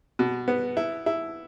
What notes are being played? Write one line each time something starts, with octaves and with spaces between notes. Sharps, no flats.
B2
B3
E4
E4